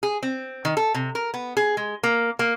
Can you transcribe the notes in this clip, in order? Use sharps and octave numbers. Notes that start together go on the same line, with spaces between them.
G#4
C4
D#3
A4
C3
A#4
B3
G#4
G#3
A#3
A#3